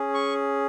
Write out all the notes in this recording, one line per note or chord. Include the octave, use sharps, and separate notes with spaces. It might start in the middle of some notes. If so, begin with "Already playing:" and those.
Already playing: C#4 G#4
C#6